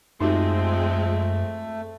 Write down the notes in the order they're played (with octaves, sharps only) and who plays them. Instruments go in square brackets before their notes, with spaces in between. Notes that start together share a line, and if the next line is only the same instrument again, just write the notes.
[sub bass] F#2 [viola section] F3 G#3 C4 [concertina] A3 [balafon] D#4 F#4 G4